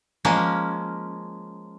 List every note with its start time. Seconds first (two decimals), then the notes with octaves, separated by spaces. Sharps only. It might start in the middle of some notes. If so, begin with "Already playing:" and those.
0.25 F3 G#3 A#3 C#4